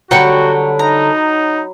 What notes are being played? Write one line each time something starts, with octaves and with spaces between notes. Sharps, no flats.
D3 F#3 G3 F#4 B4 F#5 G5 C#6
D#4 A#5